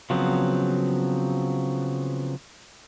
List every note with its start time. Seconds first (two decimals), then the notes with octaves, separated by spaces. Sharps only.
0.10 C#3 F3 F#3 B3 C4